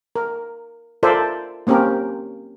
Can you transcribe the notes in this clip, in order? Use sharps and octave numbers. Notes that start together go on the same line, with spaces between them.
A#4
F4 A4 A#4 C5 D5 E5
A#3 C4 C#4 G4 A#4